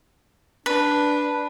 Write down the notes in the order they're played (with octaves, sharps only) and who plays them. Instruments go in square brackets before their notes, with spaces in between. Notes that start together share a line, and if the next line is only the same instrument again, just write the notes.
[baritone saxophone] D4 [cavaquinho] B4